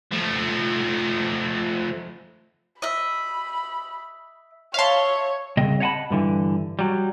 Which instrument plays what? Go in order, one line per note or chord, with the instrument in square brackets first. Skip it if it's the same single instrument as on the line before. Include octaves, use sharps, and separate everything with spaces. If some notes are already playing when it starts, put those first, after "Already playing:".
[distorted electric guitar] F3 A3
[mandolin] D#5 E5 [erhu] B5
[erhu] C#5 [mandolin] E5 C6 [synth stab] F5 A5
[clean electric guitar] C2 C#3 C4 D#5
C#5 D#5 F#5 G#5 A5 B5
G2 D3 E3
F#3 G3